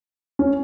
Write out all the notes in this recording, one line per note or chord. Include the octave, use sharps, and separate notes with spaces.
C#4